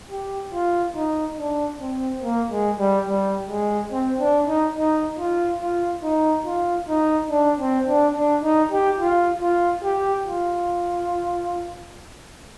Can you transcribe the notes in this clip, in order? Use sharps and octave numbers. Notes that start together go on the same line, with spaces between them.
G4
F4
D#4
D4
C4
A#3
G#3
G3
G3
G#3
C4
D4
D#4
D#4
F4
F4
D#4
F4
D#4
D4
C4
D4
D4
D#4
G4
F4
F4
G4
F4